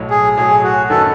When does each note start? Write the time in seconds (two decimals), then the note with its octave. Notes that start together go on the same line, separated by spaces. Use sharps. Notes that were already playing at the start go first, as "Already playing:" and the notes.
Already playing: B1 A2 F#3
0.10 G#4
0.37 B1 A2 F#3 G#4
0.64 F#4
0.90 F#2 D#3 A3 E4 A4 B4